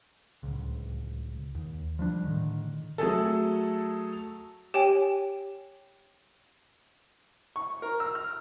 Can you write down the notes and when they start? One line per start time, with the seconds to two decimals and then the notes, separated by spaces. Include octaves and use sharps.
0.43 D1 C#2
1.55 D#2
1.99 F3 G3 D4
2.25 A2 D3 D#3
2.98 F#3 A3 G#4 A4
4.74 G4 C#5 G5 G#5
7.56 C#6
7.82 A#4
8.00 E6
8.15 F6